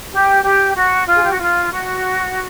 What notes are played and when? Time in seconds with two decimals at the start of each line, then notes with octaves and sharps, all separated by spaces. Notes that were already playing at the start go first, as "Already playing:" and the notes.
0.12 G4
0.43 G4
0.75 F#4
1.07 F4
1.16 G#4
1.23 G4
1.31 F#4
1.39 F4
1.71 F#4